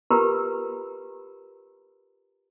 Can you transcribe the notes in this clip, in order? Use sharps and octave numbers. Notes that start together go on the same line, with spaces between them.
F4 G4 A#4 B4 A#5 B5